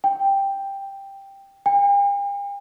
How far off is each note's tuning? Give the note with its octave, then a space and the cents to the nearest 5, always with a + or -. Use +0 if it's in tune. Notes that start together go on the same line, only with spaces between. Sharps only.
G5 +5
G5 +45